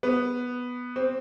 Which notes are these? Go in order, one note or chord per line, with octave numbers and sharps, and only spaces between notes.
B3
C4